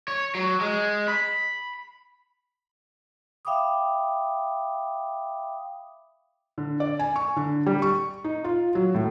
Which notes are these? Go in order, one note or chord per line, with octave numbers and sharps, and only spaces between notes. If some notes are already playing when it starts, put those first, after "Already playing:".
C#5
F#3
G#3
B5
E5 F5 G5 B5 D6 D#6
D3
D5
G#5
C#6
D3
G3
C#6
D#4
F4
F#3
A2